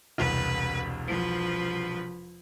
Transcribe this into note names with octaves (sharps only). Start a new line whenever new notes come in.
E1 C2 B4
F3 B4